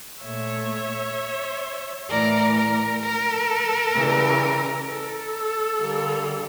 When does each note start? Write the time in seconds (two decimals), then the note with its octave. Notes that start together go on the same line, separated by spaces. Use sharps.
0.23 A#2 A3 C#5 E5
2.09 A2 E3 A3 A#4 D5
2.55 A#4
3.01 A#4
3.94 C#3 E3 G3
4.88 A4
5.80 D3 G3 A#3